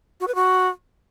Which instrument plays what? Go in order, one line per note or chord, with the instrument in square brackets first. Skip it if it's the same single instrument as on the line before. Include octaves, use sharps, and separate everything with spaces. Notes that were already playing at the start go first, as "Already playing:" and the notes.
[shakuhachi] F#4
B4
F#4